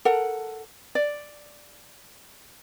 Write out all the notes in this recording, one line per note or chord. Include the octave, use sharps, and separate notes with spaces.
A4 A#4 F#5
D5